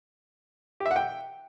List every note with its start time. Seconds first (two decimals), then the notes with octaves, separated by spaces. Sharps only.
0.80 G4
0.86 E5
0.91 F#5
0.96 G5